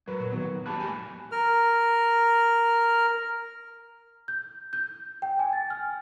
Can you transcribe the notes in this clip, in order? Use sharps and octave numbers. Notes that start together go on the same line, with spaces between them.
F#3 A#4 B4
A#2
D#3 B3
A#3 F#4 G4 A5 B5 F#6
F2 G#2 G#5
A#4 F6
G6
G6
G5
G#5
A6
F6